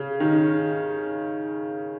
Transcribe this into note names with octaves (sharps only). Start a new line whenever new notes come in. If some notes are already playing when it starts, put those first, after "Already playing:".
Already playing: C#3
D#3